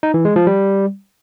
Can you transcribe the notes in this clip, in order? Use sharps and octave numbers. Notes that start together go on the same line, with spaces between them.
D#4
E3
G#3
F3
G3